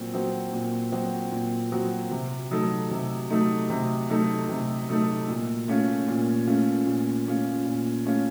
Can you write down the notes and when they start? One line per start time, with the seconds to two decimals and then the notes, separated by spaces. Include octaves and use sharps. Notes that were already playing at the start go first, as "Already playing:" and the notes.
Already playing: A#2 F#3 C4 F#4
0.13 F#3 C4 F#4
0.53 A#2
0.92 F#3 C4 F#4
1.32 A#2
1.72 F#3 C4 F#4
2.11 C3
2.51 F#3 A3 D#4 A4
2.91 C3
3.30 F#3 A3 D#4 A4
3.70 C3
4.09 F#3 A3 D#4 A4
4.49 C3
4.89 F#3 A3 D#4 A4
5.28 A#2
5.68 A3 C#4 F4
6.08 A#2
6.47 A3 C#4 F4
6.87 A#2
7.26 A3 C#4 F4
7.66 A#2
8.06 A3 C#4 F4